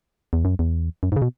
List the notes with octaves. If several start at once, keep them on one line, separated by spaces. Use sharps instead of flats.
E2
F#2
E2
F#2
G#2
C#3
B2